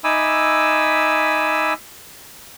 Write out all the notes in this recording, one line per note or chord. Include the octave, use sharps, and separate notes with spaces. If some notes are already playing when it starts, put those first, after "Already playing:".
D#4 E5 G#5 B5 D6 E6